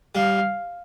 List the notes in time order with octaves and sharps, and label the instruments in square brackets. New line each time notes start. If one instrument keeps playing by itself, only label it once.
[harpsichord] G3 [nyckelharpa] F5